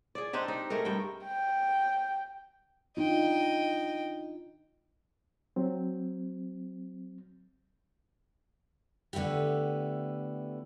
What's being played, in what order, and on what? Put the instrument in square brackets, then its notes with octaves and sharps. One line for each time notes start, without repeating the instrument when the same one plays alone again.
[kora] G#4 D5
C4 D4 D#4 G4
D#4
A3 D#4 G#4 A#4
G2 G5
[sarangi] G5
[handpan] D4 D#4 F4 [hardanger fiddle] D#5 G5
[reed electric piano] F#3 C4
[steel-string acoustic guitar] D3 A3 B3 E4 G4